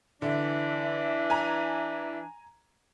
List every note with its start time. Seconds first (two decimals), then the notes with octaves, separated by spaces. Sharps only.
0.22 D3 E3 D4 E5
1.30 G#5 A#5